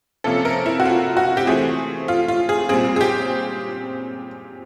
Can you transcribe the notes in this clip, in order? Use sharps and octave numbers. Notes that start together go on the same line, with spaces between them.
C3 F3 A#3 C#4 A4
A#4
E4
F#4
F4
F#4
G4
E3 A3 C4 G#4
F4
F4
G#4
A#2 G3 C4 G#4
G#4
G4